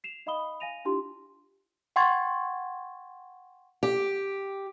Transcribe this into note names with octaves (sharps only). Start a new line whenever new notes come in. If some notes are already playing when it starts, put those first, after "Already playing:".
C7 E7 F7
D#4 D#5 F5 B5 D#6 G7
F5 G#5 A#6 D#7 F7
D4 E4 F4 G4 C6
F#5 G5 C6 C#6 G#6 A6
G4